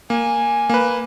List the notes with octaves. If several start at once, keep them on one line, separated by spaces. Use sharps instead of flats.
A#3 G#5
A#3 B4